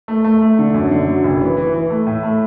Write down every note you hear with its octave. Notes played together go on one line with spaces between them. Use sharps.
A3
A3
A3
D3
F#2
D3
F#3
F#1
E3
E3
E3
A3
A2
A3